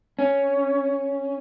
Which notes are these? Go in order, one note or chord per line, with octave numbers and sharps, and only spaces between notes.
C#4